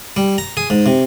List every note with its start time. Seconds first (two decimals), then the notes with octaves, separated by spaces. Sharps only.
0.17 G3
0.38 A#5
0.57 G#4
0.70 G#2
0.86 C3